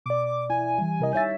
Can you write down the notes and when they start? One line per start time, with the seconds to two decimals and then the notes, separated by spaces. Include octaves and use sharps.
0.06 B2 D5 D6
0.50 E4 G#5
0.78 E3 G3 E4
1.00 C3 A#4 D#5
1.13 D#4 C#5 E5 G6 A6